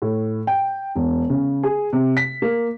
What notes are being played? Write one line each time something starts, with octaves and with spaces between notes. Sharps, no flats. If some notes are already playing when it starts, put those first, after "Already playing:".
A2
G5
E1
C#3
G#4
C3
B6
A#3